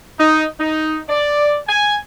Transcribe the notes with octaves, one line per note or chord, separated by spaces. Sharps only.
D#4
D#4
D5
G#5